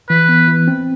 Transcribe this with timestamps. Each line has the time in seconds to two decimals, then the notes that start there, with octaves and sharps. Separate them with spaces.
0.09 E3 B4
0.29 B3
0.48 E3
0.68 C4